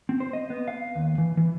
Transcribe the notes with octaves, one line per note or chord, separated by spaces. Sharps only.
C4
C5
D#5
B3
F5
D#2
E3
E3